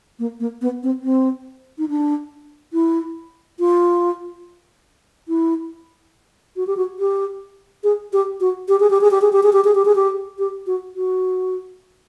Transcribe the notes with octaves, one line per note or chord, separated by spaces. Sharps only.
A#3
A#3
B3
C4
C4
D#4
D4
E4
F4
E4
F#4
G4
F#4
G4
G#4
G4
F#4
G4
G#4
G4
G#4
G4
G#4
G4
G#4
G4
G#4
G4
G#4
G4
G4
F#4
F#4